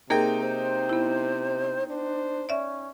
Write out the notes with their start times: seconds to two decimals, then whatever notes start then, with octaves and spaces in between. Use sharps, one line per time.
0.10 C3 A#3 D#4 G#4 A#4 G5
0.41 C5
0.89 B3 E4
1.88 D4 C5
2.49 C#4 D5 E5